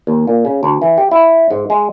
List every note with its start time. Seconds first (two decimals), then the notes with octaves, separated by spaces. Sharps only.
0.07 D#2
0.27 A#2
0.45 C#3
0.63 D2
0.82 E3
0.98 G4
1.11 E4
1.51 G#2
1.70 G#3